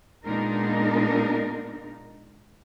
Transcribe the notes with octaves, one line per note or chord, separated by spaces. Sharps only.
A#2 G#3 B3 D4 D#4 A#4